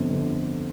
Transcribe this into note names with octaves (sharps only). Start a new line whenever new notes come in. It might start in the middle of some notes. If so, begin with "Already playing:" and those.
Already playing: G1 F2 D3
G1 F2 D3